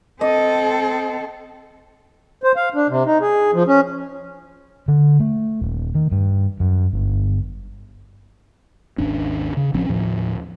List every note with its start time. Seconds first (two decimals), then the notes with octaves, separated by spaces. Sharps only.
0.21 C4 A4 D#5
2.43 C5
2.56 F5
2.74 D4
2.89 C3
3.05 D#4
3.21 G#4
3.53 F3
3.67 C#4
4.88 D3
5.20 A3
5.61 D#1
5.95 D#3
6.12 G2
6.60 F#2
6.93 G1
8.98 G#1 D#2 C#4 D4
9.57 C#3
9.74 A1 F3 C4 C#4
9.89 D#2 A2 F3